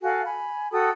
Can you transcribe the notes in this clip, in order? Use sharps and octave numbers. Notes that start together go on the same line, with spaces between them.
F#4 A4 F5 G#5
G#5 B5
F#4 A4 G5 D#6